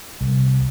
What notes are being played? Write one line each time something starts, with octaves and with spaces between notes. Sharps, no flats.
C2